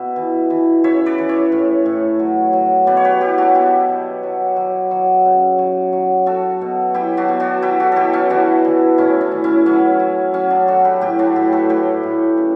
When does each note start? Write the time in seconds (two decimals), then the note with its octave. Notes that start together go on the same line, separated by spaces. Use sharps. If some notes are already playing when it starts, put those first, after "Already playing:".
Already playing: B2 B4 E5
0.16 E3
0.50 E3
0.84 C#3 C#5 E5
1.06 B4 D5
1.18 E3
1.29 C#5 E5
1.52 A2
1.86 A2
2.19 F#3
2.53 F#3
2.87 B2 B4 D5
2.97 C#5
3.04 G4 B4
3.21 F#3 E4 G4
3.38 D4 F#4
3.55 B2 E4 G4
3.89 B2
4.23 F#3
4.57 F#3
4.91 F#3
5.25 C#3
5.59 F#3
5.93 F#3
6.26 F#3 F#4 A4
6.61 B2
6.94 F#3 E4 G4
7.17 D4 F#4
7.29 B2
7.40 D4 F#4
7.62 F#3 E4 G4
7.80 F#4 A4
7.92 B2 E4 G4 A4
8.13 C#4 E4
8.30 E3 D4 F#4
8.65 E3
8.98 A2 C#4 E4
9.21 D4
9.32 E3
9.44 C#4 E4
9.66 F#3 C#4 E4
10.00 F#3
10.34 F#3 C#4
10.50 D4
10.68 F#3 F#4 A4
10.85 G4 B4
11.01 A2 E4 G4
11.19 D4 F#4
11.36 A2 E4 G4
11.52 F#4 A4
11.69 A2 G4 B4
12.03 A2
12.38 C#3